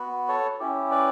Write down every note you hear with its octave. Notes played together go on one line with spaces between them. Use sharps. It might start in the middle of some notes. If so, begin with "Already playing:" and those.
Already playing: B3 F#4
A4 C#5
C#4 E4 G4
B4 D5